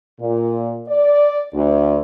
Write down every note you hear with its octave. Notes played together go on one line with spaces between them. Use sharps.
A#2
D5
D2